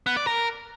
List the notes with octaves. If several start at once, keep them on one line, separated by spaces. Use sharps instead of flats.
B3
D5
A#4